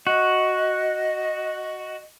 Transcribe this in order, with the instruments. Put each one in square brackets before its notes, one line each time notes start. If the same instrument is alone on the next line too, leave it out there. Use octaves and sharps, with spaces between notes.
[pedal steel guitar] F#4 [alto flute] D#5